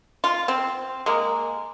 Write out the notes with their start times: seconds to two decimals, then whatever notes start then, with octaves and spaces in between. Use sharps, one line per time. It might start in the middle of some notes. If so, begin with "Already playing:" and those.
0.24 F4
0.48 C4
1.06 G#3 A#3